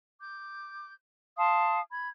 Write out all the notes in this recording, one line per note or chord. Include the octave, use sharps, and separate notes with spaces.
D6 G6
F5 A5 C6 D#6
B5 G#6